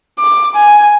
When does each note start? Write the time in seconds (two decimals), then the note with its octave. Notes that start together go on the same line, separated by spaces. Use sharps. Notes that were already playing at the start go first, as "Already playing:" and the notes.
0.20 D6
0.55 G#5